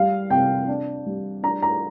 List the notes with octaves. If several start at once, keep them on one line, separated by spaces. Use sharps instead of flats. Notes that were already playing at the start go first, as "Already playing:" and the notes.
Already playing: G3 F5
C3 G5
D4
G3
D4 A#5
A#5